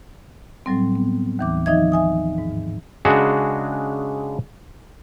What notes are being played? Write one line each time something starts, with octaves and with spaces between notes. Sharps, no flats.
A2 F#3 G3 C4
B3
D#2 E3 D6
D#3 F3 D#4 D#5 E5 G#6
E5 G#5 D#6
G#2
C#3 G#3 D4 F#4